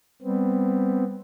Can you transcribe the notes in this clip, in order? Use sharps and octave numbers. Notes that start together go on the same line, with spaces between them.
G3 B3 C4